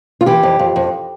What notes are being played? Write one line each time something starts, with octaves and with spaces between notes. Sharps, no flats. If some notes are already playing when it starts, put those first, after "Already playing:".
F4
E3 G4
F2
F2
F2